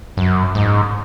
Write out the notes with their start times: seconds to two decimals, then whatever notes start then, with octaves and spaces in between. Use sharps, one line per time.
0.17 F#2
0.55 G#2